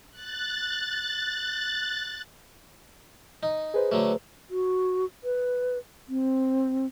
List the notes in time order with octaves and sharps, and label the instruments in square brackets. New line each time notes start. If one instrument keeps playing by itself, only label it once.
[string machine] F#6 A6
[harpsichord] D#4
[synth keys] G#4 B4 C5
[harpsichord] D3 F#3 A3
[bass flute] F#4
B4
C4